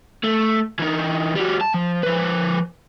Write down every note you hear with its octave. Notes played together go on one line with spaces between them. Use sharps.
A3
E3 D#4
G3 F#4
A5
F3
F3 B4